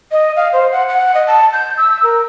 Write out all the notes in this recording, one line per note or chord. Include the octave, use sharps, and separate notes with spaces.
D#5
F5
C5
F#5
F#5
D#5
A5
G6
E6
A#4